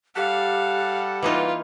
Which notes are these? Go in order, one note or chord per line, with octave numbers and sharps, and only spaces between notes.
G3 G4 A4 F5 F#5
E3 A#3 D#4 F4 B4